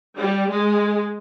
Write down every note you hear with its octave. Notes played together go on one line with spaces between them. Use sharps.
G3
G#3